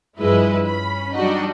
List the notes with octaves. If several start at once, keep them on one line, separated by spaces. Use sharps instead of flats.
G2 F3 G#3 E4 B4 D#5
C#4 B5
F#3 G3 D4 D#4 F#4 D#5